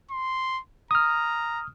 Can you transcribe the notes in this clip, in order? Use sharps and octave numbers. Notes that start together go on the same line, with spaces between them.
C6
A#5 D#6 F6